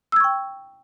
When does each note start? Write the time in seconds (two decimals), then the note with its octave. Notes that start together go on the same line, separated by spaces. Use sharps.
0.12 E6
0.16 G#6
0.20 C#6
0.24 G5